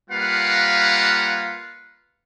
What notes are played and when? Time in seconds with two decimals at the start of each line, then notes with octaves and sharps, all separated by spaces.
0.10 G3 A#3 F4 B4 F5 F#5